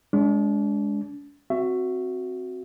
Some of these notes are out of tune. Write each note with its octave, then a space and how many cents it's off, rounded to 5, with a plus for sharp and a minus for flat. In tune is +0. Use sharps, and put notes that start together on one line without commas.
G#3 +0 D4 -40
C4 +0 F#4 +0 E5 +20